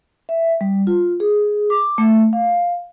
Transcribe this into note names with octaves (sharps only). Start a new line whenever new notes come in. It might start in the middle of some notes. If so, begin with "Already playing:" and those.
E5
G3
F4
G#4
D6
A3
F5